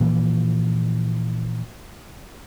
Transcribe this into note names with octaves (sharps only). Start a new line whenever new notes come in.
A#2 E3 F3 A#3